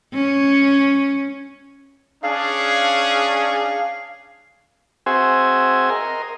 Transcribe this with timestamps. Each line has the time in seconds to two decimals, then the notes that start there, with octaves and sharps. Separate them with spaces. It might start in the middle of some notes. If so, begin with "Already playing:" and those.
0.14 C#4
2.23 C#4 D4 G#4 F5
5.06 C4 F#4 G#4 C5 E5 G#5
5.90 A#4 D#5 C6